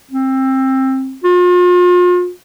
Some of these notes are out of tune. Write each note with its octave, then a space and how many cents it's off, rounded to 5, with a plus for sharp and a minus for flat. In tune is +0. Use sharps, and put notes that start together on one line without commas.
C4 +20
F4 +40